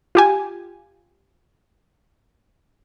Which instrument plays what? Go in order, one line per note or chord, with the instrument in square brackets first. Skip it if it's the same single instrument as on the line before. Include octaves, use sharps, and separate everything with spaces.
[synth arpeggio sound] F4 G4 G#5